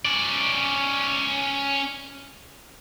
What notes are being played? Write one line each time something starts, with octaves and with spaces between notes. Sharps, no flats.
C#4 D5